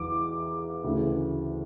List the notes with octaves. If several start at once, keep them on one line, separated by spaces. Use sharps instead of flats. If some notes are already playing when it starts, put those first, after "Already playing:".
Already playing: E2 E3 D6
D2 C#3 E3